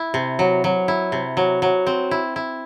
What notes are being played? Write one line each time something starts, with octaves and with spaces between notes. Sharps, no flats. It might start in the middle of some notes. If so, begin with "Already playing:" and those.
Already playing: E4
C3
F#3
F#3
E4
C3
F#3
F#3
C4
E4
E4